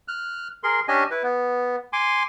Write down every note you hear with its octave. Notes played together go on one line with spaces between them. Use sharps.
F6 F#6
G#4 A#4 C6
C#4 D4 G4 D#5 G#5
E4 B4
B3
G#5 C6 D6